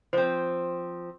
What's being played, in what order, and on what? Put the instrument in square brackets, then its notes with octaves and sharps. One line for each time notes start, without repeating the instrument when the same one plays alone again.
[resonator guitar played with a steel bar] F3 C4 [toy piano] C5